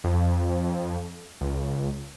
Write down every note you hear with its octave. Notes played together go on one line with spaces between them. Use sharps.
F2
C#2